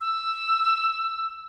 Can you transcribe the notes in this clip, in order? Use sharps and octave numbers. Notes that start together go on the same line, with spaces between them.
E6